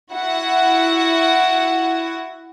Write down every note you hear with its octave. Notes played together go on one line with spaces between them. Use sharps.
E4 F#4 F#5